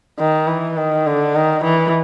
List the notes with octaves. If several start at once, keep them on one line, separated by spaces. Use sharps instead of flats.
D#3
E3
D#3
D3
D#3
E3